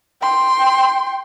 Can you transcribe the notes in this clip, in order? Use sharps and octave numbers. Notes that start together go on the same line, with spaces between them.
G5 C6